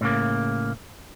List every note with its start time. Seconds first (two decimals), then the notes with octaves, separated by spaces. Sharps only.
0.01 A2 C#3 A#3